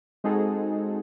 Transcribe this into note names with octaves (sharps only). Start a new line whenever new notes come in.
G#3 C4 D#4 F#4 G#4 A4